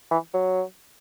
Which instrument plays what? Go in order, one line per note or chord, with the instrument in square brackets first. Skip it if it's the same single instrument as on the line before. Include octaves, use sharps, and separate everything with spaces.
[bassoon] E3
F#3